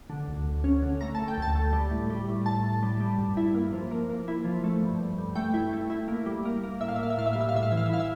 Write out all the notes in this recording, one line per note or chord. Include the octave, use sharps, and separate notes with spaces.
D3
D2
D2
C#4
D3
A3 A#5
A3 A5
G5
D2 A5
A3
G3
A2
G3
A2
A2 A5
A2
G3
G3
G2
E4
A#3
F3
A#3
A#3
E4
F3
A3
G2
G2
G2
A3 G5
E4
A3
E4
A#3
G3
A#3
A#3
A2 E5
F5
E5
A#3 F5
E5
A2 F5
E5
G3 F5
E5
F5
A2 E5
F5
E3 E5
F5
E5
E4 F5
E5